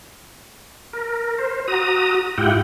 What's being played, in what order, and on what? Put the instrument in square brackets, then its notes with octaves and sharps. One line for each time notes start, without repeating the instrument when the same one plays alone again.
[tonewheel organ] A#4
C5
F#4 A#5 D#6
G#2 E4 F4 G4 F#5 G5